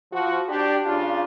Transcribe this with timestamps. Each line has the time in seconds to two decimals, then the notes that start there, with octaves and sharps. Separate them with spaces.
0.11 F3 F#4
0.48 D4 G4
0.86 C#3 D4 F4